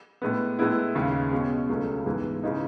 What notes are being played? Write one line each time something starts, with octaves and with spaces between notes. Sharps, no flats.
A2 G#3 B3
A2 G#3 B3 E4
D#2 C#3 G#3
B2 G#3 C#4
C#2 C#3 F#3 A3 C#4
G#2 E3 G#3 B3 E4
C#3 E3 G#3 D#4